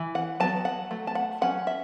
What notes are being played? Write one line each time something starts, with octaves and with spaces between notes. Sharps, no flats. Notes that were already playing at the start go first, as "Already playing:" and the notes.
Already playing: E3
F#5
F#3 B3 A5
F#5
F#3 A3
A5
F#5
F#3 C#4 F#5
E5